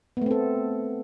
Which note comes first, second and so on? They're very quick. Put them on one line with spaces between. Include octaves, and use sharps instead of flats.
B3 A3 C4 A4